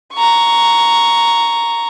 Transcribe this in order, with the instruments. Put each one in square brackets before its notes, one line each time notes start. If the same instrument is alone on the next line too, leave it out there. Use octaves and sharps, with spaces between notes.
[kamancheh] A#5 C#6